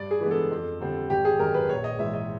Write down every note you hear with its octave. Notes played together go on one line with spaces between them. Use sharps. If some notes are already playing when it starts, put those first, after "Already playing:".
Already playing: G2 D5
G#4
E3 G#3 B3 D4
A4
F2
D3 G3 C4
G#1 G4
G#4
F#2 D#3 A#4
B4
A#1 C#5
D#5
G#2 E3 G#3 E5
D#5